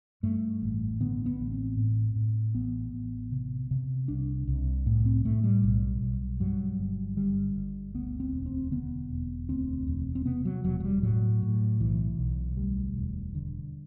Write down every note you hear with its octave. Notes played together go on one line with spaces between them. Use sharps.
G2 A3
A1
D3 B3
B3
A1
C4
A2
A2
A1 B3
A1
C3
C3
C2 D4
C2
A2
C4
A2 A3
G3
B1
B1
G2 F#3
G1
D3 G3
G1
D2 B3
C4
E1
C4
D3 B3
E1
D2 C4
E1
C4
C3 B3
F#3
E1 F#3
F#3
G3
A2 F#3
A2
B1 E3
B1
D2 G3
E1
D3